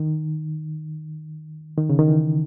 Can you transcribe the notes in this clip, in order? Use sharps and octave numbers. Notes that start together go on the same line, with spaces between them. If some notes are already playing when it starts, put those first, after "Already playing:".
Already playing: D#3
D#3
C#3
D#3
E3